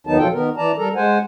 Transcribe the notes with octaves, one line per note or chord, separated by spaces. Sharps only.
D#2 D#3 F#3 B3 D#4 A5
B2 F3 F#3 F4 A4 G5
D#3 B3 A#4
E3 D5 A5 A#5
G3 A4 A#4 A#5
G#3 C5 F#5 G#5